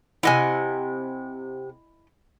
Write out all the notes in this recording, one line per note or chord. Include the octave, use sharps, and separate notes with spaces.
C3 E4 D#5 F#5 G#5